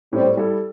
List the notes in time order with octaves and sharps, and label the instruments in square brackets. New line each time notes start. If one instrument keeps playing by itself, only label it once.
[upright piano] A2 [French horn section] G3 C4
[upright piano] G3 E4 A4